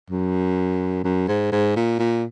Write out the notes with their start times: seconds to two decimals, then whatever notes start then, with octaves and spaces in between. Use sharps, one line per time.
0.10 F#2
1.04 F#2
1.28 G#2
1.52 G#2
1.76 A#2
1.99 A#2